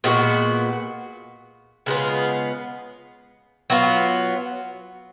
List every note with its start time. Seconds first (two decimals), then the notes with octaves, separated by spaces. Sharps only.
0.04 A#2 G#3 B3 F#4
1.86 C#3 G#3 B3 F4
3.70 F#3 B3 F4